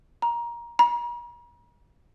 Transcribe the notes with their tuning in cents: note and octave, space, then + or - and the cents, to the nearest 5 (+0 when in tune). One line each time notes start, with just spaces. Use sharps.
A#5 +20
A#5 +45